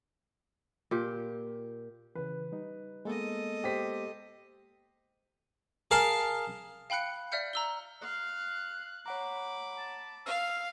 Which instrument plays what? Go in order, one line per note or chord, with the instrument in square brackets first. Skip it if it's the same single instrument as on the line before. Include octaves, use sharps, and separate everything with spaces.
[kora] A#2 G4
[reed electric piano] C#3 E3 [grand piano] B4
[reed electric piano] G3 D#4
[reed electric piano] G#3 A#3 B3 [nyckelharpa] A4 D#5
[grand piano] G4 C5 B6
[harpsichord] G#4 A#4 F5 A5 C6
[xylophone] F5 G5 B5 F#6 C#7
D5 E5 F6 G6 C#7
A#5 E6 G7
[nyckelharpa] F5 [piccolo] F#6
[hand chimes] C#5 F#5 A#5 [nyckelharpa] B5 D6
[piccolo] A5
[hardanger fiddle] F5 [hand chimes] E6 [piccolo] F6